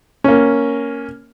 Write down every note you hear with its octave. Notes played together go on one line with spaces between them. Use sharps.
A#3 C#4